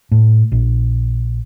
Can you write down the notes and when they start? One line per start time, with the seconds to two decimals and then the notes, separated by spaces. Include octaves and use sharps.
0.11 A2
0.52 A#1